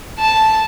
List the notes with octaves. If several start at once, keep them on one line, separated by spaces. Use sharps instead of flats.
A5